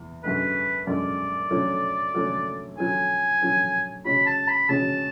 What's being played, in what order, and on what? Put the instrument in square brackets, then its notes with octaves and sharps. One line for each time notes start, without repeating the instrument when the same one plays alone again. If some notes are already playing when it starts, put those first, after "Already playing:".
Already playing: [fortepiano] E2
[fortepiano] F#2 D3 G#3 [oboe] B4
[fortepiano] F#2 D3 G#3 [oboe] D5
[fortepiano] D3 F#3 A3 C#4
D3 F#3 A3 C#4
[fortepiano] D3 F#3 C#4 [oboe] G#5
[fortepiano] D3 F#3 C#4
[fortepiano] C#3 G#3 C#4 F#4 [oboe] B5
[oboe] A5
B5
[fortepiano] C#3 G#3 C#4 F#4 [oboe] A5